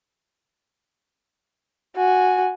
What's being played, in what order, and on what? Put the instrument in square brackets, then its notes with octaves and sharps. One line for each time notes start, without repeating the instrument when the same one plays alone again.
[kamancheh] F#4 G#5